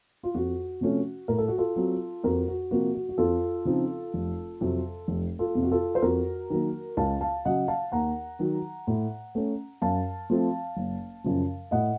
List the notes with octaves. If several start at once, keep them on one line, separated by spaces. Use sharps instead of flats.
F4
F2 F#4
C3 F3 A3 C#4
A2 A#4
A4
F#4
F4 A4
F#3 C4
F2 F#4 A#4
F#4
C3 F3 A#3 F#4
F#4
F#4
F2 F4 A4
C#3 F3 C4 D#4
F1
F2 C3 F#3
F1
F4 A4
F2 C3
F#4
F4 A4
C5
F2 F#4 A#4
D#3 F#3 A#3
C#2 F5 A5
F5 A5
C#3 F#3 D#5 F#5
F5 A5
D#2 F#5 A#5
D#3 F#3
A2
A3 C#4
F#2 F5 A5
F3 A3 C4
F#1
F#2 C#3 F3
A2 D#5 F#5